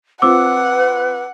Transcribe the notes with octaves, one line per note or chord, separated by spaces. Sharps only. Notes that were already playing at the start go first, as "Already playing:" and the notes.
C4 F4 B4 F#5 D6 E6